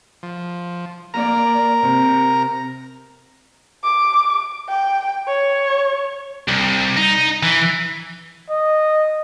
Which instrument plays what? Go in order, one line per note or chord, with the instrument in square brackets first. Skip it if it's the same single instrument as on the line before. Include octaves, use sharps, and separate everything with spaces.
[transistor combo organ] F3
[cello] A#3 D5 [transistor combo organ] A#4 A#5
[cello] C3
[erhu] D6
G5
C#5
[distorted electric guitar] C2
D#4
E3
[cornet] D#5